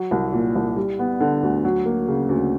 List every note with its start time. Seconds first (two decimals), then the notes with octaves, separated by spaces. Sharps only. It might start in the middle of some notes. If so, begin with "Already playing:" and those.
Already playing: F#3
0.11 C2
0.33 A#2
0.56 C2
0.76 G3
0.99 B3
1.20 D3
1.43 D2
1.65 F#3
1.85 A#3
2.08 C#3
2.29 D2